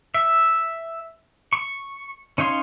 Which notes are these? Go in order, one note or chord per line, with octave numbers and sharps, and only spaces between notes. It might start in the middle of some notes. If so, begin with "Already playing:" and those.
E5
C#6
C#4 D#4 C#5 F5 C6